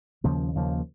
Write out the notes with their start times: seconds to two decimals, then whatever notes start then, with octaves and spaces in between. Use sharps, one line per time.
0.24 D#2 C#3 F3 A#3
0.55 D#2 C#3 F3 A#3